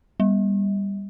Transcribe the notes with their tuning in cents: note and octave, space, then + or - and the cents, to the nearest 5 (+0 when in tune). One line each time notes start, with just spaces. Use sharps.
G3 +20